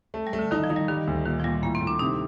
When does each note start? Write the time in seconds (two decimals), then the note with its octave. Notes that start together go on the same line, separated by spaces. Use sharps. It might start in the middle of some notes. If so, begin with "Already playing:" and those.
0.14 A3
0.27 G3
0.33 A3
0.39 D3
0.51 D#3 D#4
0.64 F3
0.70 D#4
0.76 G3
0.88 D#3 G3
1.07 D2
1.25 A#2 D#3
1.40 F3
1.44 A#2 G3
1.62 A2 A#3
1.75 C4
1.81 A2
1.87 D4
1.99 C3 D#4